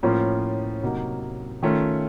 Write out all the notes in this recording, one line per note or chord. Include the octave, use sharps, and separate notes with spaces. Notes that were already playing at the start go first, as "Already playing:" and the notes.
A2 F3 A#3 C#4 F4
C3 F#3 A#3 D#4
D#3 A3 C#4 F4